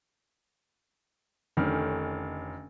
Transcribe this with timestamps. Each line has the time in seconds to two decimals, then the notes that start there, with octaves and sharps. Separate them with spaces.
1.57 F1 D3 D#3 C#4 F6